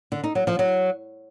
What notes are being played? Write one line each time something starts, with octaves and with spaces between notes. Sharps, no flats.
D3
D#4
F#3
F3
F#3